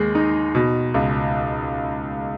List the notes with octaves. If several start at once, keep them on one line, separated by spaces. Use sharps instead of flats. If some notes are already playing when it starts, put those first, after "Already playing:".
Already playing: D#2 G#3
D#4
B2
C#2